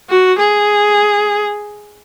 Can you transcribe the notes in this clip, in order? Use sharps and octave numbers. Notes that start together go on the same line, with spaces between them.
F#4
G#4